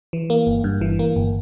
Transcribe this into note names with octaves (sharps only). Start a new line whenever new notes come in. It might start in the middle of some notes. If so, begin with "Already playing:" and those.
E3
A#3
G1
G2
E3
A#3
G1